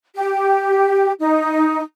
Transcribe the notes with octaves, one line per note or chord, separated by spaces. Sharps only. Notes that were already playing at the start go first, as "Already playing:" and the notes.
G4
D#4